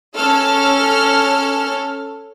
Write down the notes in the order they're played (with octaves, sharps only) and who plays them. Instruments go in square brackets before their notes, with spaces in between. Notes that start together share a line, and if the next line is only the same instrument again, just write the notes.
[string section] C#4 A4 F6